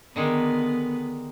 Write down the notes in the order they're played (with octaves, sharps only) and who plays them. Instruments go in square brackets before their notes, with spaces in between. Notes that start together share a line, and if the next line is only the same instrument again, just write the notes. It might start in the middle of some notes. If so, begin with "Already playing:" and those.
[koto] D3 D#3 G#3 [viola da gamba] B3